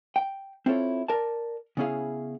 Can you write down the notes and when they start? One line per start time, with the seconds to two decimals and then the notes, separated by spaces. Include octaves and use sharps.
0.16 G5
0.66 C4 E4 F4 A4 C#5
1.08 A#4 D5 A5
1.77 C#3 B3 C#4 E4 G#4 F5